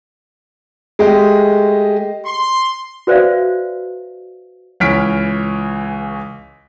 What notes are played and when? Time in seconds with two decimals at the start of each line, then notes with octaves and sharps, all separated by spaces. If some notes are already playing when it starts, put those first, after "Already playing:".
0.99 G#3 A3 G4 D#5
2.24 C6
3.07 F#4 B4 C5 D5 E5 F5
4.80 C#2 E3 C#5 F6 B6 D7